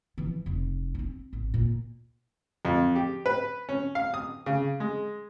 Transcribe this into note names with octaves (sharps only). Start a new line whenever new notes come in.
E3 F3
F1
C4 D4
G#1
A#2
F2
G4
B4
C#4
F5
D#6
C#3
G#3